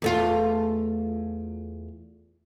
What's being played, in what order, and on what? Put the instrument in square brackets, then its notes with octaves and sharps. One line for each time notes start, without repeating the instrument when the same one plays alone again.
[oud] E2 A3 F4